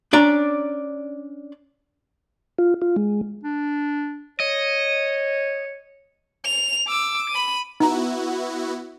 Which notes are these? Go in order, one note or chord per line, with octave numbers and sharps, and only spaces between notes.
C#4 D4 D5 A#5
F4
F4
G#3
D4
C#5 D#5
F7
D6 E6
B5 D#7
B3 D#4 E4 F#4 A#5